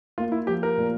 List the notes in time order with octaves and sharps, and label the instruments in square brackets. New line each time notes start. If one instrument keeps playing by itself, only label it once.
[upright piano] A#3 [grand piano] F4
[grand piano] E4
[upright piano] F3 [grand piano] G4
[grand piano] A#4
[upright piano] A#2